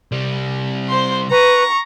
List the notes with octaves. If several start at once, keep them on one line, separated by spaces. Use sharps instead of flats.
C3 G3
C5 C6
B4 A#5 C#6